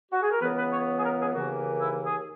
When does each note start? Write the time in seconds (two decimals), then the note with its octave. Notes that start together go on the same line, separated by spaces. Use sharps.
0.12 F#4
0.22 G#4
0.31 A#4
0.40 C#2 C#3 E3 B3 B4
0.56 B4
0.71 C#5
0.96 G#4
1.03 A#4
1.19 G#4
1.34 D#2 C#3 E3 A#3 F#4
1.80 E4
2.05 G#4